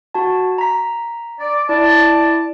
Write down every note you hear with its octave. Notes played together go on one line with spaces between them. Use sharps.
F#4 A5
A#5 B6
D5
E4 D5 A5